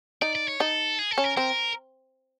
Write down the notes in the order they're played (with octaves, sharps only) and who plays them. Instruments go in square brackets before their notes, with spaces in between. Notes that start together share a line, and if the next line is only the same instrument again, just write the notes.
[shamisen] D#4 [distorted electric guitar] D5
[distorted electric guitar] D5
C#5
[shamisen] D#4 [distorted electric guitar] A4
[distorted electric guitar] G#4
A4
[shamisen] C#4
[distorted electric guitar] A#4
[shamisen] C4 [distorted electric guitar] A#4